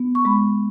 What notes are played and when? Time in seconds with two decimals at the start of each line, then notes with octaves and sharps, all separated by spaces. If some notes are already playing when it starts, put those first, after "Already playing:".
Already playing: B3
0.15 C#6
0.25 G#3 B5